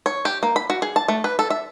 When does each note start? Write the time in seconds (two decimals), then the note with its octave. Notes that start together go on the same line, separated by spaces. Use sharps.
0.06 C#5
0.25 G4
0.43 A#3
0.56 B5
0.70 F#4
0.82 G#4
0.96 A5
1.08 A3
1.24 B4
1.39 A4
1.50 E5